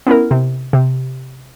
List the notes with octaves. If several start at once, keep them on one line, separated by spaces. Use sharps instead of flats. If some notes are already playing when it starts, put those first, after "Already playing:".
B3 C#4 E4 A#4
C3
C3